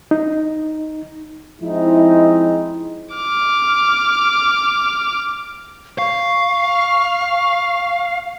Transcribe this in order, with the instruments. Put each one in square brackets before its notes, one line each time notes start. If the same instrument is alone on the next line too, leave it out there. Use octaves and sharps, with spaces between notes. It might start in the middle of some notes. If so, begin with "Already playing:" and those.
[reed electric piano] D#4
[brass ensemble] F3 G#3 C4 D#4 E4
[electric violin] D6 F6
[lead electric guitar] F5 [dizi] C#6